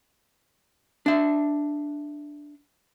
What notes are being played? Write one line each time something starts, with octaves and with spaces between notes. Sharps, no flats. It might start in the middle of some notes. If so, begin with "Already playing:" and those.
D4 E5